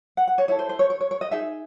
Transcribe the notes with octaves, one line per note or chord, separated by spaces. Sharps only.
F#5
F#5
C#5
E4 A4 C#5
C5
C5
C#5
C#5
C#5
C#5
D#5
D#4 G#4 E5